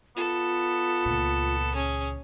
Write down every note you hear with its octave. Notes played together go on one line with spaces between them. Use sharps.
B3 F4 A4
C#2 A#2
C#4 G#4